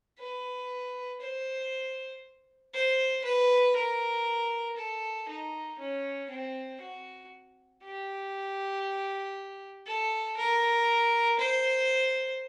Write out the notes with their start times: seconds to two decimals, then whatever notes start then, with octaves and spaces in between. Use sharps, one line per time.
0.19 B4
1.21 C5
2.74 C5
3.24 B4
3.76 A#4
4.77 A4
5.29 D#4
5.79 C#4
6.30 C4
6.81 F#4
7.83 G4
9.86 A4
10.37 A#4
11.39 C5